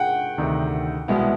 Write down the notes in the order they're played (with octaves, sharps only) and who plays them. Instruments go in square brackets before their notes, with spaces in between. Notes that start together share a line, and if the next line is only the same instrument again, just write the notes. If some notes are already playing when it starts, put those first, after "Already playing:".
Already playing: [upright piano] F#5 G5
[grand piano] D2 C3 D#3
C2 B2 G#3 B3 E4